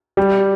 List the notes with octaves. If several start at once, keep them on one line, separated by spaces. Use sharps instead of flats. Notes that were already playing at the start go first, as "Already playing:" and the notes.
G3